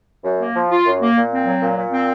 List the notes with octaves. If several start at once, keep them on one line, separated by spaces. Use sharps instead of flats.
F#2
A#3
F3
F4
F#2
A#3
A#2
C4
F#3
A#2
A#2
C4